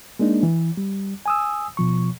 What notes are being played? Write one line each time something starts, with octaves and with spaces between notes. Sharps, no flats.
G#3 A#3 D4 D#4
E3
G3
G#5 D#6 E6
B2 F3 C#6